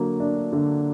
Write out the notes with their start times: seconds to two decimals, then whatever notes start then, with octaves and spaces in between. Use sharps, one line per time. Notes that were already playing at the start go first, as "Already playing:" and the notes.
Already playing: D3 F#3 A#3
0.20 D4
0.53 D3